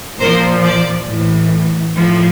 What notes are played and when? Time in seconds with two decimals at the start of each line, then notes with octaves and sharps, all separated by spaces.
0.19 A#2 F3 A#4 C5
0.64 C5 D5
1.08 A2 E3
1.96 A2 F3